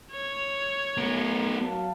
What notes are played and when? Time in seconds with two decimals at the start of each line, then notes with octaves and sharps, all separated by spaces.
0.12 C#5
0.97 B1 B3 A#4
1.60 F#3 F5 A5